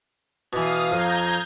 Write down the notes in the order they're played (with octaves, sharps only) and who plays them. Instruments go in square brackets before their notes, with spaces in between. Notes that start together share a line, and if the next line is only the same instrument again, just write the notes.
[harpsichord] B2 E3 [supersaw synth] F5 D#6
[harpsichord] F2 [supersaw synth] A#5 G6 G#6